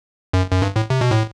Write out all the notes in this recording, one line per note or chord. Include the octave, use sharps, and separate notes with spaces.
F#2
F#2
G2
A2
C3
B2
A2